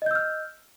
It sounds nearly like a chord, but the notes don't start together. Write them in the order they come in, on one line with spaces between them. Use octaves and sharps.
D#5 G6 E6 F6